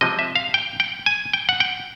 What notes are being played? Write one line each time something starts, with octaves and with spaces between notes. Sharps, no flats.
C3 F3 G#3 D#5
E5
F5
G5
G5
G#5
G5
F#5
G5